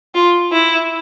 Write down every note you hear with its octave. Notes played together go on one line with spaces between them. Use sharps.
F4
E4